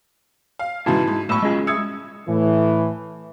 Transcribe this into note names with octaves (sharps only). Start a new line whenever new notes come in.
F5
G#2 C#3 E3 E4 F#4 A5
G#2
B1 A2 B5 C#6 E6 E7
G#3 C#4 F4 G#4 D#5
E5 D#6 E6 G#6 C#7
A2 E3